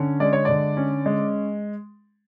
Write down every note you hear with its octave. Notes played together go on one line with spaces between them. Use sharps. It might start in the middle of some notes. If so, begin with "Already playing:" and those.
Already playing: D3 C#4
G#3 D5
C#5
D3 D5
C#4
G#3